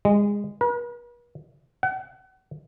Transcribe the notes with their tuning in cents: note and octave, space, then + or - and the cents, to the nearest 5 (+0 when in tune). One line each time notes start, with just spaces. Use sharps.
G#3 -25
B4 -45
F#5 +35